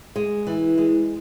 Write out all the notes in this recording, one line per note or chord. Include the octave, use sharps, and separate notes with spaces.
G#3
E3
G#3